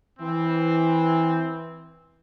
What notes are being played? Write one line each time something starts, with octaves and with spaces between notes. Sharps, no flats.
E3 C4